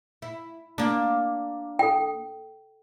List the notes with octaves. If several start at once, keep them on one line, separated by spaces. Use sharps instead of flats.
E4
A#3 D4
A4 G5